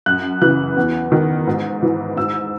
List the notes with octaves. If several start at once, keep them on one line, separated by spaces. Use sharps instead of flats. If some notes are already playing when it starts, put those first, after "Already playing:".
F#2 F#6
C#3 E3 F#6
E2
D#3
G#2
E3
G#2 E6